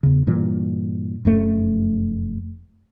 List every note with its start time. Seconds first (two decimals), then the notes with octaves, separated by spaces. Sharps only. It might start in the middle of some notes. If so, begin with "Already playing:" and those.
0.03 E2 C#3
0.27 G2 A#2 E3 G3
1.25 F1 F#2 A3